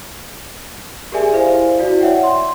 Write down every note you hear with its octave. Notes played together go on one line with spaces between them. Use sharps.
G4 G#4 A#4 D5 E5 G#5
E4 C5 F5
E4 F#4 D5
C#5 E5 F#5 G5
C6